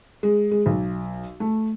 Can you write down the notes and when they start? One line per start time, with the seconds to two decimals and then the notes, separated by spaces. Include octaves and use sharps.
0.23 G#3
0.51 G#3
0.66 B1
1.40 A3